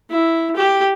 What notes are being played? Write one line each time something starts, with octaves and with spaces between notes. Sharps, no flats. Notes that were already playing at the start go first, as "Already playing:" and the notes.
E4
G4